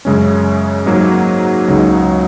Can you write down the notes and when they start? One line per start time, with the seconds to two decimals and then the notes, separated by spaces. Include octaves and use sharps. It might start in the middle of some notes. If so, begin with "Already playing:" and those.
0.05 F#2 C#3 G#3 C#4
0.86 G#2 F#3 A#3
1.68 C#2 C#3 F#3 D#4